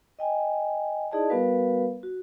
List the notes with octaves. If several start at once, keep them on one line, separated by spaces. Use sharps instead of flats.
D#5 G5 G#5
D#4 E4 G#4 D5 D#5 A5
G3 B3 F#4 A#4 B4 F5
F#4